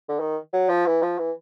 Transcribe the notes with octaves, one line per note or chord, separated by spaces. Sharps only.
D3
D#3
F#3
F3
E3
F3
E3